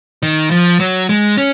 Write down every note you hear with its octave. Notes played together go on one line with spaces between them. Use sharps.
D#3
F3
F#3
G#3
C#4